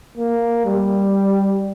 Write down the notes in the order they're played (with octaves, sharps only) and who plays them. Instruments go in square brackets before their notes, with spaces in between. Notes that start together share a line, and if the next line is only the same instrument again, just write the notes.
[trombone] A#3
G3